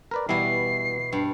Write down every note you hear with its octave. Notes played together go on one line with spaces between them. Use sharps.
A#4 B4 D5
B2 E3 G3 B3 E4 C7
G2